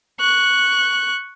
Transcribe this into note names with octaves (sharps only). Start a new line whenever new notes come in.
C#6 F#6